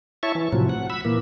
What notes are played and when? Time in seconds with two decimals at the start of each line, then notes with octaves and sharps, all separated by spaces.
0.23 E4 C#5 E5 A5 C#6
0.35 E3
0.53 A2 C3 F3 F#3
0.69 F#5
0.90 B5 E6
1.05 A#2 E3 A#3